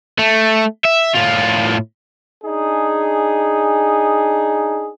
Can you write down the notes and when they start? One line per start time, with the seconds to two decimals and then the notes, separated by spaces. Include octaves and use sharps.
0.19 A3
0.85 E5
1.15 A2 F4
2.44 D4 D#4 G#4